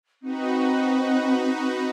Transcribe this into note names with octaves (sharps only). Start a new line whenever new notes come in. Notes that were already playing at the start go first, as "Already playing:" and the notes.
C4 D#4 F#4 B4